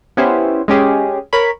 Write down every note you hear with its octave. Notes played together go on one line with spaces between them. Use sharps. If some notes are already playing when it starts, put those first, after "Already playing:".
B3 C#4 E4 G4 C5
G#3 C#4 G4 G#4
A#4 C#5 B5